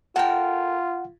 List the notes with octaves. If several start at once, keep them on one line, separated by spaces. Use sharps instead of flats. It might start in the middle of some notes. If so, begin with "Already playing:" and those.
F4 A4 A#4 F#5 G5